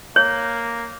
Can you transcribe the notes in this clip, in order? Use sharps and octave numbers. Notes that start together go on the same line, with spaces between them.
A#3 C#5